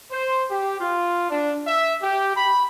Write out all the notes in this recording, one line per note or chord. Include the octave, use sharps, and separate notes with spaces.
C5
G4
F4
D4
E5
G4
B5